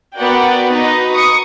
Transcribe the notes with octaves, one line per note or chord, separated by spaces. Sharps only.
B3 F#4 A#4 D5 F#5 G5
D#4 F#4 B4 D#5
C#6 D#6 C#7